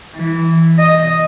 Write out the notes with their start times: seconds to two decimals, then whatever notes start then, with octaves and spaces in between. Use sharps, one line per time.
0.15 E3
0.79 D#5